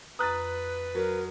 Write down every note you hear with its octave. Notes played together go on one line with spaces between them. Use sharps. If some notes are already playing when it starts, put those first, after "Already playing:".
F2 B4 A#5 D#6 F#6 A6
F#3 A#4